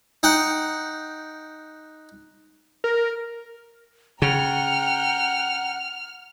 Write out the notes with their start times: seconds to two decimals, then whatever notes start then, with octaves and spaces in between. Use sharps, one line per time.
0.23 D#4 F#5 G5
2.84 A#4
4.22 C#3 F#5 G5 A#5 F6